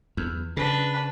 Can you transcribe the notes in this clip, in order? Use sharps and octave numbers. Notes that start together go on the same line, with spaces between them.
E2
C#3 D4 B4